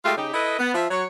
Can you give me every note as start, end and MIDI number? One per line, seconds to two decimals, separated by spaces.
0.05 0.13 56
0.05 0.13 57
0.05 0.13 65
0.05 0.13 67
0.17 0.28 49
0.17 0.28 63
0.17 0.28 67
0.34 0.55 64
0.34 0.55 69
0.34 0.55 71
0.34 0.55 75
0.59 0.73 59
0.74 0.86 53
0.74 0.86 76
0.90 1.05 54
0.90 1.05 73